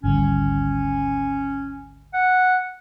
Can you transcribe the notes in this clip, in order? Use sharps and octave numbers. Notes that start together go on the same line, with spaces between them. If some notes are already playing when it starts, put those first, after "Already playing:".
G#1 D2 G3 C#4
F#5